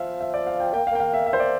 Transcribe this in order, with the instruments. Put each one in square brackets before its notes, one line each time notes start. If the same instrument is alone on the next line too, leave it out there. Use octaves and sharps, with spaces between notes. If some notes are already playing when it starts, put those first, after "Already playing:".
Already playing: [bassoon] F3 [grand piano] E5 F5
[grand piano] E5
D5
F5
G5
[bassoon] A#3 [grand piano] G5
[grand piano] F5
[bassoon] A#3 [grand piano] G5
[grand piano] F5
E5
E5
C5
D5